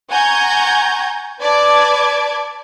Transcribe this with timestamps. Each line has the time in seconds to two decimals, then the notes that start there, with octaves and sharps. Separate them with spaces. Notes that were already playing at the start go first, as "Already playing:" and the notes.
0.11 F#5 G#5 A#5 C#6 G6 G#6
1.41 B4 D5 A5 D6 G#6